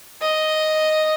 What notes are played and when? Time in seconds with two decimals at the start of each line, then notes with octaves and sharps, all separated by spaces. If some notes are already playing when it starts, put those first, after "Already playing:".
0.21 D#5